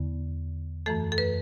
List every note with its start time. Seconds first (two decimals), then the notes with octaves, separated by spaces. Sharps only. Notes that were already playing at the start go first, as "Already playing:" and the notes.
Already playing: E2 D3 B3
0.86 F#2 E3 A3 A4
1.12 A4
1.18 B4